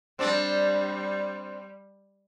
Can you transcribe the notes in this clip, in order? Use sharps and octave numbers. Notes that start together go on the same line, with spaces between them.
G3 C4 D4 D5